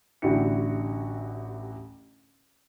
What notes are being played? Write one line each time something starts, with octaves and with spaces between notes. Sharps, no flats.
A1 D3 E4 F#4 G4 C#7